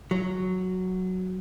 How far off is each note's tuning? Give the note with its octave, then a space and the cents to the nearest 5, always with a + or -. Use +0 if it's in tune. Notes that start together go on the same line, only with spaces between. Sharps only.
F#3 +0